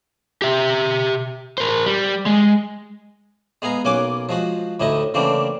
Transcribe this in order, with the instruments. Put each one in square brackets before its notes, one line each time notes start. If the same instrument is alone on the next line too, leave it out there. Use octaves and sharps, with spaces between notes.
[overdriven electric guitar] G4 E5
A#4 C5
G3
G#3
[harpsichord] G#3 B3 G#4 F5 A#5
B1 A#3 C#4 F#5 G#5 D6
F3 G#3 F#4
D2 A2 D#4 E4 D#5
C#3 E3 A3 A#3 C4 D4